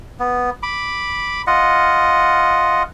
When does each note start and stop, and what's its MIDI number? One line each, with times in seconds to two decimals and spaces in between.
0.20 0.50 59
0.63 1.42 83
0.63 1.42 86
1.47 2.83 65
1.47 2.83 75
1.47 2.83 78